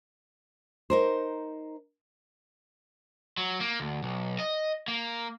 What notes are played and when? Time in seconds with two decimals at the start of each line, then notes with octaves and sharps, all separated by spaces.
0.90 D#4 A#4 C5
3.37 F#3
3.60 A#3
3.80 D2
4.03 B1
4.39 D#5
4.88 A#3